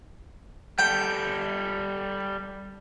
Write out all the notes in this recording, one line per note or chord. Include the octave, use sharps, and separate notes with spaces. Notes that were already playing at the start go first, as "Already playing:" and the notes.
G3 A4 G5